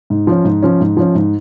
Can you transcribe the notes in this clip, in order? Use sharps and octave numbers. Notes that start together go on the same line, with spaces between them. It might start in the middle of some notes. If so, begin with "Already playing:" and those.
G#2
F3 C#4
G#2
F3 C#4
G#2
F3 C#4
G#2